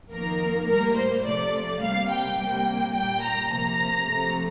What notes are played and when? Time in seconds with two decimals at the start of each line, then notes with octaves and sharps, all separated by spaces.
0.12 F2 D#3 A#3 A#4
0.68 A2 G3 A#3 A#4
0.97 C5
1.25 C3 F3 A3 D5
1.81 C3 G3 A#3 F5
2.10 G5
2.38 C3 G3 A#3
2.94 A#2 G3 A#3 G5
3.23 A#5
3.51 C3 F3 A#3 A#5
4.07 C3 F3 A3